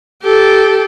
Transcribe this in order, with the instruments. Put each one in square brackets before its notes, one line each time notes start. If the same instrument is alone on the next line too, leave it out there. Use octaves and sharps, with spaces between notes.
[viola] G4 A4